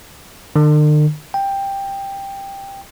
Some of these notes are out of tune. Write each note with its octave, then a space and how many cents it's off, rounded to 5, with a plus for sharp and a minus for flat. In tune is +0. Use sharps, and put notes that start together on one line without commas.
D3 +45
G5 +10